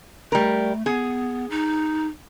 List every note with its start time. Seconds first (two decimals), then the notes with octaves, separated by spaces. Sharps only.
0.32 G3 A3 A#4
0.86 B3 G#4
1.50 D#4